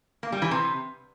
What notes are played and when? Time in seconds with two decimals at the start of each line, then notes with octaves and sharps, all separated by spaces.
0.23 A#3
0.32 G3
0.42 E3
0.51 C3